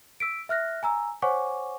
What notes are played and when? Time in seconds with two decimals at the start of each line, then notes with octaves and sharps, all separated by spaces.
0.20 E6 B6 D7
0.49 E5 F6 F#6 A#6
0.83 G#5 A#5 E6
1.22 C5 C#5 F#5 G#5 C#6 D6